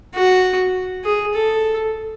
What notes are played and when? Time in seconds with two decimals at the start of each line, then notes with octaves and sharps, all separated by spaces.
0.14 F#4
1.04 G#4
1.34 A4